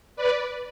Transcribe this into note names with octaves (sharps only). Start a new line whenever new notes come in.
B4 D5